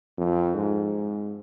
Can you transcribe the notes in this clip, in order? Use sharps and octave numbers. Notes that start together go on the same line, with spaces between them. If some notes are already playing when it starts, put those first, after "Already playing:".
F2
G#2